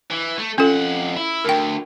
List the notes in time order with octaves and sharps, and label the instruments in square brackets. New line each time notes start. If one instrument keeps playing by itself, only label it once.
[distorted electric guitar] E3
A3
[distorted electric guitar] F2 F#5 [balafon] C#4 F4 A4
[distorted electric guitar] E4
[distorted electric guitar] D2 [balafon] A#4 G5